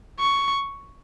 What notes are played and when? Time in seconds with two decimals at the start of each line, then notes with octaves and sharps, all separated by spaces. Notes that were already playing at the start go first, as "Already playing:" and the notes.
0.19 C#6